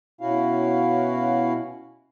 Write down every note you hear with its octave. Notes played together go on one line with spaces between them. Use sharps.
B2 C#4 E4 F#4 F5